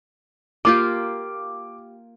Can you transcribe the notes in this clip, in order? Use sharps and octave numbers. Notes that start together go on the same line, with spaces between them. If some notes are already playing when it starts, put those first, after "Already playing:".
A#3 F4 G4 D6